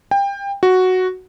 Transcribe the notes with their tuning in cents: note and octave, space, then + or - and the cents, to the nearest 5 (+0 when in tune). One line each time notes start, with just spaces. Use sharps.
G5 +25
F#4 +0